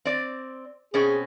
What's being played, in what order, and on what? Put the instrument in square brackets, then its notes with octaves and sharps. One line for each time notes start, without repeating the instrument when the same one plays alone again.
[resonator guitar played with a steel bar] C4 D5
[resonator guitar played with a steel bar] B2 C4 C#4 [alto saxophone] G#4